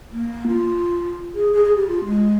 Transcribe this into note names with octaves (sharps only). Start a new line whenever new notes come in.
A#3
F4
G#4
G#4
G#4
G4
F4
G#3